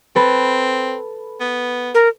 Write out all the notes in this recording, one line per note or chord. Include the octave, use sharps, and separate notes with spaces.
C4 A4 B4
B3
A#4